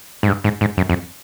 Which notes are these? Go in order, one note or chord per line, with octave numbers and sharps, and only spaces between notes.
G#2
G2
G#2
G#2
F#2
F2